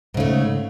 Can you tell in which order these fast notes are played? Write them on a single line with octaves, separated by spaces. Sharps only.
G#2 C#3 A3